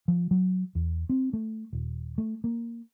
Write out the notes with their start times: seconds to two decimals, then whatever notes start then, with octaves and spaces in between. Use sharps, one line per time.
0.08 F3
0.31 F#3
0.75 E2
1.09 C4
1.33 A3
1.73 D#1
2.18 A3
2.44 A#3